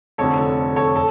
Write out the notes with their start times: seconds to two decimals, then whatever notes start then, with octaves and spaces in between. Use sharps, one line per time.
0.18 F1 F2 D3 A4 C#5
0.76 A4 C#5
0.96 A4